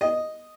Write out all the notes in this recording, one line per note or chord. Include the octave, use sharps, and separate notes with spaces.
D#5